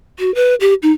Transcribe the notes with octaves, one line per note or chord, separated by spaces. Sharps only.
F#4
B4
G4
D#4